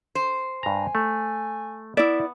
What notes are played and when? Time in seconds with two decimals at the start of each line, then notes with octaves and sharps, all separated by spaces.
0.15 C5
0.63 G2 G#5 A#5
0.95 A3
1.97 B3 E4 D5 E5